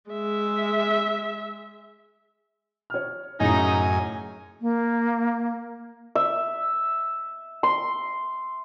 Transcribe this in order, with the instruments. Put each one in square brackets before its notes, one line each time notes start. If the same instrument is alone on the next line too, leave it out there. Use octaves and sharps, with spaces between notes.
[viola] G#3 E5
[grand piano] C#5 F6
[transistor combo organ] F#2 G#5 [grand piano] A2 C#3 E4 [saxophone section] D#4
[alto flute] A#3
[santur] E5
C6